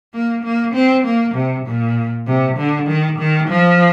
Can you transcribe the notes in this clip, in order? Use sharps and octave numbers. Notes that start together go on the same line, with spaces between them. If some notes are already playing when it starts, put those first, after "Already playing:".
A#3
A#3
C4
A#3
C3
A#2
C3
D3
D#3
D#3
F3